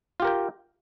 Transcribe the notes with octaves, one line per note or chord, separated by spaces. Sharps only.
F4 G4 A#4 G5